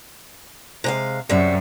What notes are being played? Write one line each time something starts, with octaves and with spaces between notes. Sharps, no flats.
C3 G#3 F5
F#2 C3 G3 E5